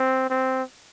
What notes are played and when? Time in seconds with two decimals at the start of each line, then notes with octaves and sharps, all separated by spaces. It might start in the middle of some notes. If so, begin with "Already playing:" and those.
Already playing: C4
0.30 C4